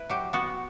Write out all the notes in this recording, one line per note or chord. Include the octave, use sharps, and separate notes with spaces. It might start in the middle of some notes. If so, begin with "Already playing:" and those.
Already playing: E4 B4
F#3 G4
B3 F#4